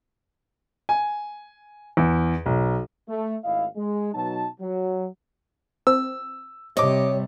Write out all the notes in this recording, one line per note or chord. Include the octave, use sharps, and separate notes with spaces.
G#5
E2
B1
A3
G#1 A3 E4 D#5 F5
G#3
B2 F#3 D#4 A5
F#3
C4 E6
C3 G3 C#5 D#5 D6